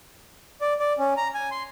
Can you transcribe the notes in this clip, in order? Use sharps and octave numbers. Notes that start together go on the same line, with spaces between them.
D5
D5
C#4
A#5
G#5
C6